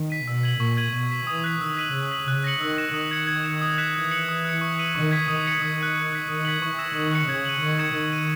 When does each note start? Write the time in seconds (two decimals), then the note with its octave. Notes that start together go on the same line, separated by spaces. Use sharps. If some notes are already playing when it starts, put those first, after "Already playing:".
Already playing: D#3
0.10 B6 D#7
0.27 B2 E6
0.43 G#6 D#7 F#7
0.60 A#2 C#6
0.77 G#6 D#7 F#7
0.93 B2 G#6
1.11 B6 E7
1.27 E3 D#6
1.44 F#6 B6 F#7
1.60 D#3 E6
1.77 B6 D#7 F#7
1.93 C#3 E6
2.11 B6 F#7
2.27 C#3 F#6
2.44 A#6 C#7 F#7
2.60 D#3 E6
2.78 A#6 E7
2.94 D#3 D#6
3.11 G#6 C#7
3.27 G#6
3.44 C#7 E7
3.62 D#6
3.78 F#6 B6 E7
3.94 E3 G#6
4.11 C#7 F#7
4.29 D#6
4.45 F#6 C#7
4.61 C#6
4.78 E6 B6 D#7 F#7
4.95 D#3 C#6
5.11 G#6 B6
5.28 D#3 D#6
5.45 A#6 C#7 F#7
5.62 D#3 D#6
5.78 F#6 B6 D#7 F#7
5.95 C#6
6.13 F#6 B6
6.28 D#3 D#6
6.45 G#6 B6 D#7 F#7
6.62 E3 C#6
6.78 E6 A#6 E7
6.95 D#3 D#6
7.13 F#6 C#7
7.29 C#3 G#6
7.45 D#7 F#7
7.62 D#3 C#6
7.79 G#6 C#7 E7
7.96 D#3 G#6
8.13 D#7 F#7